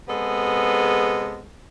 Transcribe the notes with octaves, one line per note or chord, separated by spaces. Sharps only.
C3 G#3 B3 G#4 A4